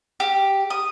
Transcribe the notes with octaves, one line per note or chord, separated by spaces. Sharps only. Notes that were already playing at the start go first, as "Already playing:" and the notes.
G4
D#6